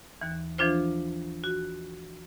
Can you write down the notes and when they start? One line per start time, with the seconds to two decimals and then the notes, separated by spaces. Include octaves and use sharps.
0.21 D#2 E3
0.58 E3 F3 D4 F4 C5
1.44 F#4